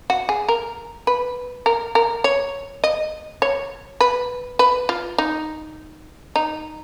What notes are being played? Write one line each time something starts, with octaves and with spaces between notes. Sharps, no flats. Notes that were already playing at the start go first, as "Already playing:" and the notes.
F#4
G#4
A#4
B4
A#4
A#4
C#5
D#5
C#5
B4
B4
F4
D#4
D#4